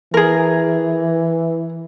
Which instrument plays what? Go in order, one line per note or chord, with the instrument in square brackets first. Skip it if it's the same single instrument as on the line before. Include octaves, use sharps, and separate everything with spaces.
[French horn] E3 [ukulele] G#4 A#4